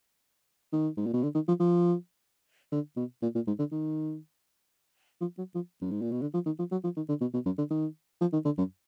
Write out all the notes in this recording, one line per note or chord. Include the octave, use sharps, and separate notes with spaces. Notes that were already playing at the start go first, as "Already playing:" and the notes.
D#3
G#2
A#2
B2
D3
D#3
F3
F3
D3
B2
A#2
A#2
G#2
D3
D#3
F3
F#3
F3
F#2
G#2
A#2
B2
D3
F3
D#3
F3
F#3
F3
D#3
D3
B2
B2
F#2
D3
D#3
F3
D#3
D3
F#2